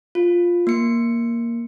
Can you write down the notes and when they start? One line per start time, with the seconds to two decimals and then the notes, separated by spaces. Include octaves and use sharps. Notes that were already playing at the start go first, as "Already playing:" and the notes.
0.15 F4
0.67 A#3 C#7